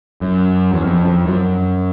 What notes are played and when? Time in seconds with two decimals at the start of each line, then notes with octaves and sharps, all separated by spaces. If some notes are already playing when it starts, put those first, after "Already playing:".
0.21 F#2
0.73 E2
0.84 F2
1.05 F2
1.26 F#2